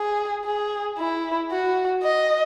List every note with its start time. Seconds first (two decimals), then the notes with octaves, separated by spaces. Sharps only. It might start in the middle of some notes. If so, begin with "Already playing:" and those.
Already playing: G#4
0.45 G#4
0.98 E4
1.51 F#4
2.04 D#5